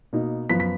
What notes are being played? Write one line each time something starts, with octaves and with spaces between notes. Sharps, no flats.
B2 A#3 D#4
F#2 F3 B3 F4 B6
B6